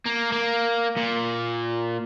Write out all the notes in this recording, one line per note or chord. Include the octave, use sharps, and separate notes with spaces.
A#3
A#3
A#2